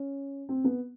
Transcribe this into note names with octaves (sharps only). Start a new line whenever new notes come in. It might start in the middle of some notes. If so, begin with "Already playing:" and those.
Already playing: C#4
C4
B3